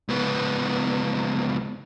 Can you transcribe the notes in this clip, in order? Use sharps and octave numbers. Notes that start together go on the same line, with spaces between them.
C#2 B3